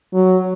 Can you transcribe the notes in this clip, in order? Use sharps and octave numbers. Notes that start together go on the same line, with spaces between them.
F#3